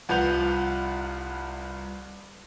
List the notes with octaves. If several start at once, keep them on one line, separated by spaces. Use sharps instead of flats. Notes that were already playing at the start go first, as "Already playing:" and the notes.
C2 F3 B4 F#5 G6 F7